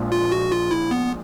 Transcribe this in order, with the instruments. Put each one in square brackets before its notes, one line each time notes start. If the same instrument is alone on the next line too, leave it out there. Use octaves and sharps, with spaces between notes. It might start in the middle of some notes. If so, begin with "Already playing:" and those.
Already playing: [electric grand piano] A#1 A#2 F3 G#3
[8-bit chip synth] F4
F#4
F4
E4
B3